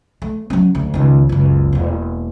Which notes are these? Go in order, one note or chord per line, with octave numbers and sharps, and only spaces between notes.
A3
F#3 C#4
D2
C#2 D#3
F#1 C#2
E1 A#3